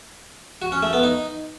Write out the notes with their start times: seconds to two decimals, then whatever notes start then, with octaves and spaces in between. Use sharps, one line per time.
0.62 F#4
0.72 C#4
0.83 A3
0.93 B3
1.03 D#4